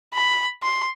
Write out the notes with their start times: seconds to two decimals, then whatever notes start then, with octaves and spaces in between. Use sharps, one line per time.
0.13 B5
0.62 C6